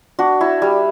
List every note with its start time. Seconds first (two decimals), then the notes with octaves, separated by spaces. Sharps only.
0.19 D4 F#4
0.41 E4
0.62 G3